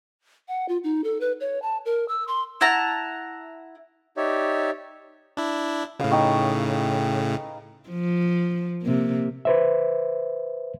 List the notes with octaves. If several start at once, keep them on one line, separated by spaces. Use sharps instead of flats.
F#5
F4
D#4
A4
B4
C#5
A5
A#4
E6
C6
E4 F#5 A5 A#5
D#4 G4 C#5 D5 E5
D4 E4
A2 C#3 B4 F5
D#4 G5 C#6
F3
C3 A#3
B4 C5 E5